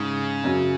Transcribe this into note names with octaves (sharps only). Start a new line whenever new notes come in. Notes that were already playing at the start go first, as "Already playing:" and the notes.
Already playing: G#2 C#3
F#2